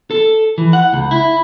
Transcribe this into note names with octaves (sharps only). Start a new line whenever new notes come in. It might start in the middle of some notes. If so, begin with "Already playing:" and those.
A4
E3
F#5
C#2
E4